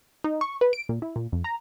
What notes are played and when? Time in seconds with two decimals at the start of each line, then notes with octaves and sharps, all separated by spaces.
0.24 D#4
0.41 C#6
0.61 B4
0.73 D7
0.89 A#2
1.02 E4
1.16 A#2
1.32 F2
1.44 A#5